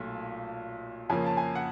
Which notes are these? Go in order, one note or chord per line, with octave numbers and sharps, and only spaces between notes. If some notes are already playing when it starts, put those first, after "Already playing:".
Already playing: B1 A#2 A3
F2 C#3 F3 A#3 G#5
A5
G#5
F#5